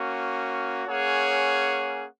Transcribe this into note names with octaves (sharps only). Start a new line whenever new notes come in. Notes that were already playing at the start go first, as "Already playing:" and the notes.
Already playing: A#3 C#4 F#4
A#3 C#4 G#4 C#5 F#5